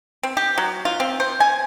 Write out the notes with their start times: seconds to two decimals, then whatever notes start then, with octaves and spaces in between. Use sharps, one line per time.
0.23 C4
0.37 G4
0.58 F#3
0.85 F4
1.00 C4
1.20 C5
1.40 G#5